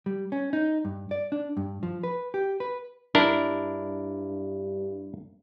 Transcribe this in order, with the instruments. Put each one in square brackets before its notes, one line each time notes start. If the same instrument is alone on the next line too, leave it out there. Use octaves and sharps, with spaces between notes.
[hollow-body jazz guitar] G3
C#4
D#4
G2
D5
D4
G2
F3
B4
G4
B4
[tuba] G2 [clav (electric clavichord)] D4 E4 A#4